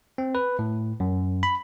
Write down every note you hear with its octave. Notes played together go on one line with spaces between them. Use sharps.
C4
B4
A2
F#2
B5